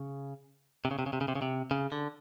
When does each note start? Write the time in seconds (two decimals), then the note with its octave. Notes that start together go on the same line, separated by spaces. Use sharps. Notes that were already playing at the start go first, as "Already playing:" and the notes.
Already playing: C#3
0.85 C3
0.91 C#3
0.99 C3
1.06 C#3
1.13 C3
1.21 C#3
1.28 C3
1.35 C#3
1.42 C3
1.71 C#3
1.92 D3